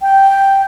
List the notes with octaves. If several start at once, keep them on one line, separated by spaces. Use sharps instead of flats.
G5